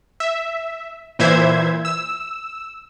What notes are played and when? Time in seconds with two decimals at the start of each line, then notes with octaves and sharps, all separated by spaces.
0.20 E5
1.19 A#2 E3 C5 E5 G#6
1.85 E6